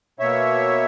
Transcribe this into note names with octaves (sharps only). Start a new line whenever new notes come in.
B2 A#3 C#5 E5